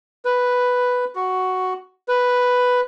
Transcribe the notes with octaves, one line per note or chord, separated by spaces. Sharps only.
B4
F#4
B4